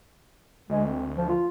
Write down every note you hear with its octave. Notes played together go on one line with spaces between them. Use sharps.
D2 G#3
C4
F3
F4